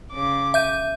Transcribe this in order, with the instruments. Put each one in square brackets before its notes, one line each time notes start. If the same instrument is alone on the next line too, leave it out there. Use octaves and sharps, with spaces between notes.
[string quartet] C#3 D6
[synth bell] E5 G6 D#7